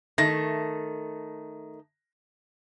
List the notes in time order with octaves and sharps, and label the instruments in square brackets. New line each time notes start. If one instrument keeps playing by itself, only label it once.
[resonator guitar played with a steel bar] D#3 A3 [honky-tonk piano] A#6